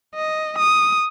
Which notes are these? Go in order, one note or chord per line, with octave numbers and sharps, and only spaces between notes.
D#5
D#6